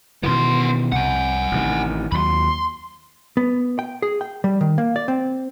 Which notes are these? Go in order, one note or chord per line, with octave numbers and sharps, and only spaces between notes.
B2 D#3 E3 B3 C6
C2 F#5 G#5
A1 C3 D#3
D#2 F#3 B5 C6
B3
G5
G#4
G5
G3
D#3
A#3
D5
C4